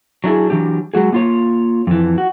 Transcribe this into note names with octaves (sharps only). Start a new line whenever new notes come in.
F#3 D4 E4 G#4
E3 F#3 D4 G4
F#3 G#3 F#4 G#4
A#3 F4 C#5
F2 E3
F#4